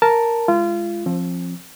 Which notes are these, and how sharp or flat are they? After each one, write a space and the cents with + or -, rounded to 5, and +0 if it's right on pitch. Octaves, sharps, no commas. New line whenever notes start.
A#4 +0 A5 +0
G#3 +0 F4 -30
F3 +0 C4 +30